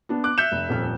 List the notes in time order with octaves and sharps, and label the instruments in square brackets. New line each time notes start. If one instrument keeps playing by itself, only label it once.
[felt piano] B3 D4
[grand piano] D6 F#6
[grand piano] E5 G6 E7 [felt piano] C#7
[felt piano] F1
D#1 F2 F6